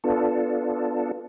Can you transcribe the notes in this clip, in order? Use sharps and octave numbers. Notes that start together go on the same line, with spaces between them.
B3 D4 F4 A4